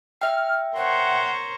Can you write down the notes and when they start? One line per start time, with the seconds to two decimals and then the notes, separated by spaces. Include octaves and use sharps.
0.21 E5 G5 F6
0.76 A#4 C5 C#5 F#5